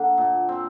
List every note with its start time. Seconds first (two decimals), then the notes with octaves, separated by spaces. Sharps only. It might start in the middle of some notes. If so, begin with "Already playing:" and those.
Already playing: D3 A#3 F#5
0.18 A#2
0.49 C4